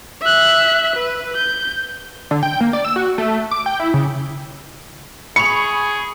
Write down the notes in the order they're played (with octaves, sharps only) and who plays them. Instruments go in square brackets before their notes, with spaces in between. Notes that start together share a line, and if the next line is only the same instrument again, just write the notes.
[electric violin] E5 F#6
B4
G6
[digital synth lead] D3
G5
A#3
D5
E6
F#4
A3
D6
G5
E4
C#3
[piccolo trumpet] G#4 [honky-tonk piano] B5 C#6 F7 [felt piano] C#7